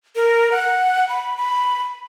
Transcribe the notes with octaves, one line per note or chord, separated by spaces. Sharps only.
A#4
F#5
B5
B5